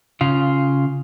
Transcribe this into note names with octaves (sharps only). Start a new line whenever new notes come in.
C#3 F4